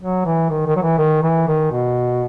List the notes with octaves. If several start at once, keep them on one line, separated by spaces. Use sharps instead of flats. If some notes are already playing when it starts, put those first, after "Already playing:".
F#3
E3
D#3
D#3
F#3
E3
D#3
E3
D#3
B2